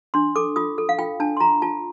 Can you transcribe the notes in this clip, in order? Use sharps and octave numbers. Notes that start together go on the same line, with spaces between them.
D4 C6
A4 D6
F4 D#6
A4
F5
F4 G5
D4 A5
C6
F4 A#5
F4 A5